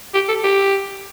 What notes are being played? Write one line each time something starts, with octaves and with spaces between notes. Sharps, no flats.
G4
A4
G4